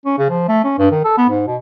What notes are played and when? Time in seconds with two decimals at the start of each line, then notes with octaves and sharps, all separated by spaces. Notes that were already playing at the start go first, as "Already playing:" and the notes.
0.05 C#4
0.18 C#3
0.30 F3
0.48 A3
0.64 C#4
0.78 G2
0.91 D#3
1.04 A4
1.18 B3
1.29 G#2
1.47 B2